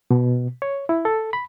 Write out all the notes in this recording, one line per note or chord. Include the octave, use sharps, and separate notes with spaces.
B2
C#5
E4
A4
B5